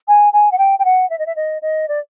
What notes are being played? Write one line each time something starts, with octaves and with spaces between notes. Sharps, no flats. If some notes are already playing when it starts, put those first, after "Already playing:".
G#5
G#5
F#5
G5
G5
F#5
E5
D#5
E5
D#5
D#5
D5